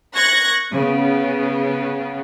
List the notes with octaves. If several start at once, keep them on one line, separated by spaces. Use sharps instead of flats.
C#6 F#6 G#6 A#6
C#3 B3